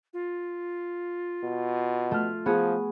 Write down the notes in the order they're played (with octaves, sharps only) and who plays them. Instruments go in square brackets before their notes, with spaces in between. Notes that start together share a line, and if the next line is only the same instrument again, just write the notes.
[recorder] F4
[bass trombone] B2
[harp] A3 F6
[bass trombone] F3 [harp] B3 F#4 G#4